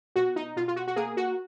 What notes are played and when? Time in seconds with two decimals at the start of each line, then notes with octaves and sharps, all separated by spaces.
0.16 B2 F#4
0.36 D#4
0.56 B2 F4
0.68 F4
0.76 F#4
0.87 F#4
0.96 A#3 G#4
1.17 F#4